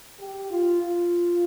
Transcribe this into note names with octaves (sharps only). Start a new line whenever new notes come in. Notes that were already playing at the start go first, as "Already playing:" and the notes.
G4
F4
F4